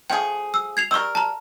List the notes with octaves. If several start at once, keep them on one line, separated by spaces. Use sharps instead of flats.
F3 A3 G#4 G5
E6
G#6 C7 F7
G3 A#4 C#6 E6
A5 A#5